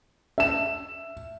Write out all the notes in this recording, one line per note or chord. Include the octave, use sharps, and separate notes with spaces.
E5 E7